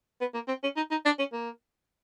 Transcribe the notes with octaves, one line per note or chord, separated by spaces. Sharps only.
B3
A#3
C4
C#4
D#4
D#4
D4
C#4
A#3